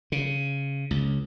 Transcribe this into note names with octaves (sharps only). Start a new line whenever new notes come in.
C#3
C#2